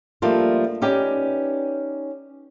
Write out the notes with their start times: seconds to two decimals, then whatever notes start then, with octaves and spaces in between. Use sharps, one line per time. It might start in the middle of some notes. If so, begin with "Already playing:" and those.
0.22 F3 G3 A3 A#3 D4 F4
0.82 C#4 D#4 G4 B4 D5